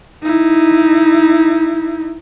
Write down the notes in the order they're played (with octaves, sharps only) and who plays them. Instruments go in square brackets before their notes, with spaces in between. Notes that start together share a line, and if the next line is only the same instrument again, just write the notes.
[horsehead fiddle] D#4 E4